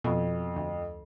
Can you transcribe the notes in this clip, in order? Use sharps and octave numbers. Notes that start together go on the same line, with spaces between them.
F2 B2
D2